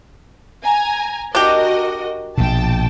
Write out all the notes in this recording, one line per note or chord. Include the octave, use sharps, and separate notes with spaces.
G#5 A#5
D4 F#4 G4 A#4 D#5
A#1 B2 G5 A5